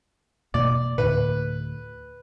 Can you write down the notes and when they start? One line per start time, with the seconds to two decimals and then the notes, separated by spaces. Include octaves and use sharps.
0.54 E2 B2 A#3 D5
0.98 D2 A2 B4